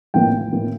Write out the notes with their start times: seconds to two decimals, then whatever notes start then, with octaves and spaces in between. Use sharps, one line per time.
0.14 A#1 A2 E3 A#3 G5
0.52 A2 E3 A#3